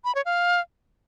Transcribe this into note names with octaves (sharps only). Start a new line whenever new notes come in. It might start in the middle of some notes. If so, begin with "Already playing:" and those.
B5
C#5
F5